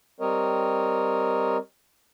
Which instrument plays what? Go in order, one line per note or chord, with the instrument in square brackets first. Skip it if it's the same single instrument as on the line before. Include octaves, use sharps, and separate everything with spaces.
[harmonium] G3 C4 A#4 C#5 D#5